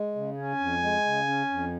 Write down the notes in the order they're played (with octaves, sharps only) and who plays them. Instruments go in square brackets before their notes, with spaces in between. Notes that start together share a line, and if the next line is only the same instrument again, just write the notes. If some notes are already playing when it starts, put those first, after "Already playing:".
Already playing: [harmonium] G#3
C#3
[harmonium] C#4 [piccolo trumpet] G#5
[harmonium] F2
G#3
C#3
C#4
F2